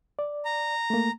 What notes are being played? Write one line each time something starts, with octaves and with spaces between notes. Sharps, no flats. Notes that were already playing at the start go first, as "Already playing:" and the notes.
D5
A#5
A3 A#3